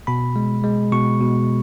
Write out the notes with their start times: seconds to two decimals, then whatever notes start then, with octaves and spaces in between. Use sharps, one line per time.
0.07 B2 B5
0.36 G#3
0.64 G#3
0.92 B2 C#6
1.21 B2